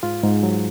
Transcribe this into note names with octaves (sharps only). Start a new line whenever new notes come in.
G#2 F4
G#2
F#3